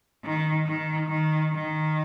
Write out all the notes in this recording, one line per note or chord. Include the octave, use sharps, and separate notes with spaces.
D#3
D#3
D#3
D#3